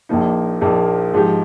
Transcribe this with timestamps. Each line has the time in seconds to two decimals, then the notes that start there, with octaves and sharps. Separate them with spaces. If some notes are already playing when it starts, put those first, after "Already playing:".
0.09 A#1 A#2 F3 A#3 D#4
0.61 A#1 A#2 F3 A#3 D#4
1.14 G#2 F3 G#3 D#4 G4